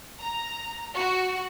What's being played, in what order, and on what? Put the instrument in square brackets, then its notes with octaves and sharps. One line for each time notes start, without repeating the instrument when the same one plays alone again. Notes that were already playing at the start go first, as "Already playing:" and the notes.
[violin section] A#5
F#4